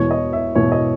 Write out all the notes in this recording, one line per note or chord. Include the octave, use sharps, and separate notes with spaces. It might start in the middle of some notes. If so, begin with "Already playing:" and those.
Already playing: E1 E2 B2 C#5
D#5
E5
E1 E2 B2 C#5
D#5